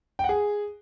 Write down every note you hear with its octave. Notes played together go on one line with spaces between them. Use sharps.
G5
F#5
G#4